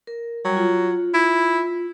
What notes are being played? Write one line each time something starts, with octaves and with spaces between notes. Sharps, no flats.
A#4
F#3 G3
F4
E4